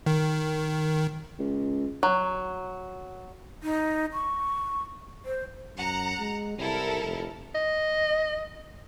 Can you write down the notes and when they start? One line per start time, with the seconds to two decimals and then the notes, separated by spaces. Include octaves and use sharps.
0.06 D#3
1.39 C#2
2.03 F#3
3.63 D#4
4.13 C#6
5.25 C5
5.76 F#2 F#5 A#5
6.19 G#3
6.58 C2 E4 A4 A#4
7.03 F1
7.55 D#5